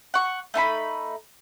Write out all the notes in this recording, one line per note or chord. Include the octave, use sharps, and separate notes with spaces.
F#5 C#6
A3 D#4 A5 B5